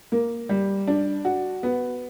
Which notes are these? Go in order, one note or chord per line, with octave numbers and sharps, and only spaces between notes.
A#3
G3
D4
F#4
B3